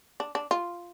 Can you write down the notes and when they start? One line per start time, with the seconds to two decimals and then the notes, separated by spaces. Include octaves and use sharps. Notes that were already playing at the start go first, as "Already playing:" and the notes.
0.20 D4
0.35 D4
0.51 F4